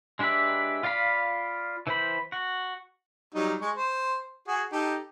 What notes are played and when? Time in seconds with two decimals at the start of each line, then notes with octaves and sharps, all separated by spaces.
0.19 G#3 D4 G4 B4 E5
0.83 F4 D5 F5 B5
1.87 E3 C5 B5
2.32 F#4
3.34 F#3 G3 D#4
3.61 G#3 C#6
3.76 C5
4.48 F#4 G#4
4.72 D#4 G4 A4